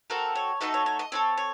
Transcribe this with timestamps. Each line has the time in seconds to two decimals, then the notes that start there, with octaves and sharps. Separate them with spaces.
0.10 C4 F#4 A4 A#4
0.35 C#5
0.61 A3 D#4 F#4 A4 D#5
0.74 C#5
0.86 C#5
0.99 D#5
1.12 C4 D#4 A4 C#5
1.37 C#5